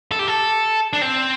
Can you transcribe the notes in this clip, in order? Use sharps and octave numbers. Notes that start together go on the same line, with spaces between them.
A4
G4
A4
D4
C4